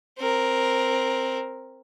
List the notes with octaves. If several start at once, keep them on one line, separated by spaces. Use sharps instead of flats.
C4 A#4